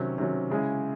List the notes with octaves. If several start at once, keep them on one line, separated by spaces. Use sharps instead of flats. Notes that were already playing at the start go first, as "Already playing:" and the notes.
Already playing: C3 D#3 F#3 C#4
C3 D#3 F#3 C#4
C#3 G#3 C#4 E4 G#4